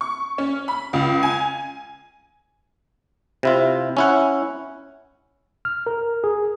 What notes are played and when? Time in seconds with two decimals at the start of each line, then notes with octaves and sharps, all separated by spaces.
0.01 C#6
0.38 C#4
0.68 B5
0.93 C#2
1.23 G#5
3.43 C3 E4 F4
3.97 C#4 E4 F#5
5.65 F6
5.87 A#4
6.24 G#4